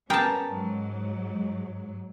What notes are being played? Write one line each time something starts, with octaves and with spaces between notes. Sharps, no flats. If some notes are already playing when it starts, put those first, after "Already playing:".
G3 B3 C#4 G#4 A#4 G5 A5
G#2 F#3